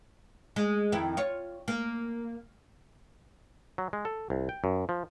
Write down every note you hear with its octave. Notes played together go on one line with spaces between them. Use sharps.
G#3
F2 D#3 E4
F4 C#5
A#3
F#3
G#3
A4
C2
G5
F#2
F3